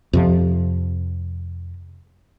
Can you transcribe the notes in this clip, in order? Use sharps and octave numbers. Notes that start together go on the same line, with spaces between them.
F2 C3 F3